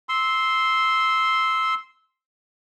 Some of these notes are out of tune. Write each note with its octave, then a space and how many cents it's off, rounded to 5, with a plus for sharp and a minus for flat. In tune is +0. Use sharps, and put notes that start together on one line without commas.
C6 +0 E6 -15